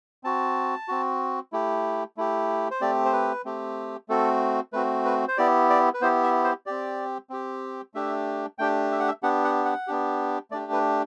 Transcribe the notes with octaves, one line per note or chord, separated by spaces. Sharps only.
C4 F#4 A5
C4 F#4
A3 E4 G4
A3 E4 G4
C5
A3 C4 G4 D5
C5
B4
A3 C4 G4
A3 C4 F#4 A4
A3 C4 F#4 B4
B4
C5
B3 E4 G4 D5
D5
B4
B3 E4 G4 C5
E5
C5
C4 G4 D5
C4 G4
A3 D4 G4 E5
A3 D4 G4 G5
E5
F#5
E5
B3 D4 G4 F#5
F#5
F#5
B3 D4 G4
A3 D4 G4 D5
B4